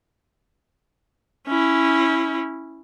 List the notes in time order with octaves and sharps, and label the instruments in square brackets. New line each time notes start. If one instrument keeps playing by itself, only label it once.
[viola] C#4 E4